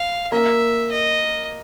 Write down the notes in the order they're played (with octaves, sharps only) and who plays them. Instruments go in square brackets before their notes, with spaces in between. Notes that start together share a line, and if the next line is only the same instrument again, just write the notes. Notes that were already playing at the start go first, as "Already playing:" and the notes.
Already playing: [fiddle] F5
[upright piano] A#3 A#4 [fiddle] E5
[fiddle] D#5